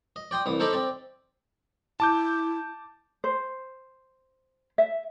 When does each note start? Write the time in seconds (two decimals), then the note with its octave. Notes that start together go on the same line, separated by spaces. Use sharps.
0.16 D#5
0.31 D5 G5 C6 D#6
0.46 C2 E3 D#6
0.60 D#4 A4 C5 D#5 B5 D6
0.73 C4 D5
2.00 E4 A5 D6 G6
3.24 C5
4.78 E5